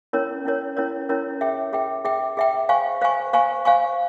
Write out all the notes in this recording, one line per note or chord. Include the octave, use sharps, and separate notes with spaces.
C#4 E4 A#4 C#5
C#4 E4 A#4 C#5
C#4 E4 A#4 C#5
C#4 E4 A#4 C#5
G#4 E5 G5
G#4 E5 G5
G#4 E5 G5
G#4 E5 G5
C5 F5 G#5 C#6
C5 F5 G#5 C#6
C5 F5 G#5 C#6
C5 F5 G#5 C#6